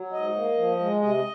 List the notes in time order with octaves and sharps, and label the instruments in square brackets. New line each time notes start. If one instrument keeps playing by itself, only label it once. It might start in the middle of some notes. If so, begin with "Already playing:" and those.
Already playing: [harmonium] F#3
G#2 D#5
A#3
F3
G#3
C3 D#5